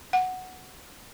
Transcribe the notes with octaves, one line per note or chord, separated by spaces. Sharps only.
F#5